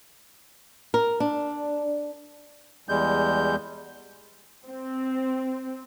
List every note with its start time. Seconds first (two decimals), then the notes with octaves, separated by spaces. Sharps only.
0.94 A#4
1.20 D4
2.89 E2 G3 G#3 G6
4.69 C4